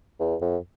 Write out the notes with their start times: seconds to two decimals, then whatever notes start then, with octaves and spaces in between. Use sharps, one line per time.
0.19 E2
0.41 F2